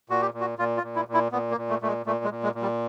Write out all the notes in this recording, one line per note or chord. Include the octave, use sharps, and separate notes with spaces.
A#2 F#4
G4
A#2
F#4
A#2 F4
F4
A#2
E4
A#2
E4
A#2 B3
A#3
A#2
A3
A#2 A3
G#3
A#2 A3
G#3
A#2
G#3
A#2
G3